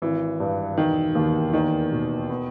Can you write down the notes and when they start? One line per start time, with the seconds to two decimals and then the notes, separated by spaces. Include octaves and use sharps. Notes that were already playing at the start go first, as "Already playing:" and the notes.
0.02 G#1 E3
0.40 G2
0.77 E1 D#3
1.15 D#2
1.53 E2 D#3
1.92 B2
2.29 B3